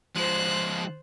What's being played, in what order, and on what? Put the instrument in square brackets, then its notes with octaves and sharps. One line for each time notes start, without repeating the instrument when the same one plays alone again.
[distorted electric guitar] F3 G#3 [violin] C5 F#6